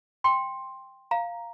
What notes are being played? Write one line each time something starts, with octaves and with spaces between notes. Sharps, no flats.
G5 C6
F5 A#5